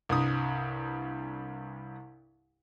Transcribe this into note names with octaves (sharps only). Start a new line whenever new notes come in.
C2 G2 D#6